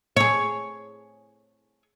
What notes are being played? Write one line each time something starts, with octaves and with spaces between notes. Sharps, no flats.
G#4 C#5